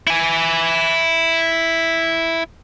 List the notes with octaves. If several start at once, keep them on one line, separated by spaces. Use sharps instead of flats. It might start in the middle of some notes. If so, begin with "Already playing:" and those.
E4 G#5